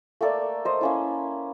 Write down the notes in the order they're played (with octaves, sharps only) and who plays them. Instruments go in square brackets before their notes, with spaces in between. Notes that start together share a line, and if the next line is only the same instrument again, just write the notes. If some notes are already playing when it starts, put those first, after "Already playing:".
[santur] A3 A#3 A4 D5
C5 D#5
A#3 C#4 E4